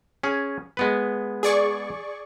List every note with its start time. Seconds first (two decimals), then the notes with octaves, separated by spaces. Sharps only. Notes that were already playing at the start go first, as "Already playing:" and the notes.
0.23 C#4 G#4
0.77 G#3 B3 B4
1.43 G#4 D5 C#6